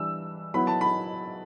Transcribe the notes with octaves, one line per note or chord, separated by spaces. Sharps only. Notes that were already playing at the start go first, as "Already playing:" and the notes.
Already playing: E3 G3 D4 E6
F#3 B3 E4 B5
A5
B5